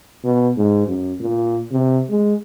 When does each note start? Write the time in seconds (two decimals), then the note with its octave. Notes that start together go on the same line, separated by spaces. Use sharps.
0.24 B2
0.57 G#2
0.87 F#2
1.20 A#2
1.72 C3
2.09 G#3